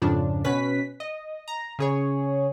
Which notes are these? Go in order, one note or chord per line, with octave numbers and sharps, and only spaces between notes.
F2 G#2 C#3 F3 D4
B2 C#4 B4 B6
D#5
A#5
C#3 G#4 C#5